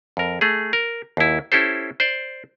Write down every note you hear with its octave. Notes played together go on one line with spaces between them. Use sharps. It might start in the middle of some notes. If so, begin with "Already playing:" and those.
F2 A#4
A3 G#4
A#4
D#2 E4
C#4 E4 G4 A4 C5
C5 D5